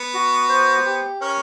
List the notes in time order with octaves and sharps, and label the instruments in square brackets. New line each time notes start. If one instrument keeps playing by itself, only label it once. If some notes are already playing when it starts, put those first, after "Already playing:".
Already playing: [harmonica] B3
[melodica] F#4
C5
G4
[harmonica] C#4 [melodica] A#4